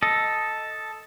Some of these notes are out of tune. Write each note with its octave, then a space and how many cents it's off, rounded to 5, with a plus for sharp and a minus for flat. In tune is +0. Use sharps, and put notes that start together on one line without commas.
A4 +0 D#5 +10